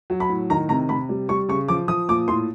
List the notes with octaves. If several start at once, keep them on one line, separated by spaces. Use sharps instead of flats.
F#3
B5
A2
D#3 A#5
C3 A#5
C3 B5
G3
G3 C#6
C#3 C#6
F3 D6
F3 D#6
A#2 D6
A2 C6